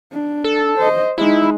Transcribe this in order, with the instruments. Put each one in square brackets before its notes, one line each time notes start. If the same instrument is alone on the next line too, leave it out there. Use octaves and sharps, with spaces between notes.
[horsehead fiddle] D4
[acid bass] A4
[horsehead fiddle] C5 D#5
[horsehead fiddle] G#3 D#4 [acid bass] E4